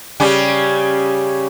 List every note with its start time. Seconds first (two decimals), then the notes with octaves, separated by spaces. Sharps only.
0.20 C#3 G3 C#4